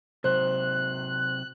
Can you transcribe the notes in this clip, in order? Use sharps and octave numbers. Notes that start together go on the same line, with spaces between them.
C3 F#3 C5 F#6